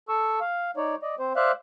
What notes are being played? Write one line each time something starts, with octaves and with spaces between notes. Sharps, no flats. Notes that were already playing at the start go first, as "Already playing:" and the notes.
A4 C#6 E6
F5
D#4 C#5 D5
D5 D#5
C4 C5
C5 D5 E5 F5 F#6